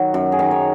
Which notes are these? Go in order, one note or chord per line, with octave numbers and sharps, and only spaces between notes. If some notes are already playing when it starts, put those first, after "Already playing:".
Already playing: D#3 F#3 F#4
F#2
G#4
D#3
C#5